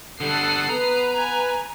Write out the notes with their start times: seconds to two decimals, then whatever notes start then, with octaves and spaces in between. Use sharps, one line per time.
0.21 D3 G3 A4 F#5 D#6 C7
0.69 B3 B4 A#5
1.16 G#5